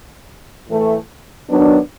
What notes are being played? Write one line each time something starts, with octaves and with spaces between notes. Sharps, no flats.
A2 E3 A3
D#3 F#3 B3 D4